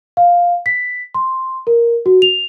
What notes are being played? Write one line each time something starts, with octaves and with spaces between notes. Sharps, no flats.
F5
B6
C6
A#4
F#4
F7